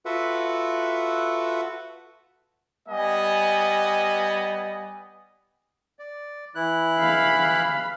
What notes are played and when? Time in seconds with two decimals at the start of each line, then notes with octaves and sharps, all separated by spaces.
0.05 F4 F#4 A4 B4 E5 F#5
2.88 G3 B3 D#5 G#5
5.99 D5
6.55 E3 E4 F#6
6.99 F5 B5